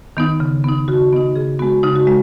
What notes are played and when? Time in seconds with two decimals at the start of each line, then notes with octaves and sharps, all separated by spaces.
0.17 D#3 B3 D#4
0.40 C#3
0.64 B3 D#4
0.88 C#3 F#4
1.12 B3 D#4 D#5
1.36 C#3 G#4
1.59 G#3 B3 F#4
1.83 C#3 D#4
1.96 F#4
2.07 G#3